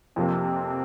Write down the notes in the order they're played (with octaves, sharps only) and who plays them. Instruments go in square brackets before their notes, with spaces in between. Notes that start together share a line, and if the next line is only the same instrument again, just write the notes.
[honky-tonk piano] F2 C3 F3 A#3 [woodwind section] C4